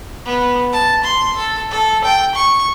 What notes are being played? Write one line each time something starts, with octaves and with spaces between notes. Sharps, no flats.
B3
A5
C6
A4
A4
G5
C#6